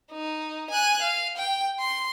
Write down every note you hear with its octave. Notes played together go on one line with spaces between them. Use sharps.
D#4
G#5 F#6
F5
G5
C6